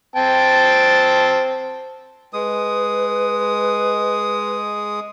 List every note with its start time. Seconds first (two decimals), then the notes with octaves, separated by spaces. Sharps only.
0.16 C4 G5 A5
2.33 G#3 B4 D#6